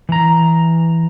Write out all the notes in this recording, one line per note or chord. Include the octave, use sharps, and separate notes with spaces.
E3 A#5